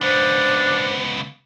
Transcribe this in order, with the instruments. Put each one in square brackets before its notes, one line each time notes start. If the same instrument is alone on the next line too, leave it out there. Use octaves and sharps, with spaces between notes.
[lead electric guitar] C#2 B3 [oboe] D4 [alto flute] C5